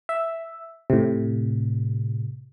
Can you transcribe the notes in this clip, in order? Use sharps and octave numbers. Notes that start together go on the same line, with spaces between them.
E5
A2 C3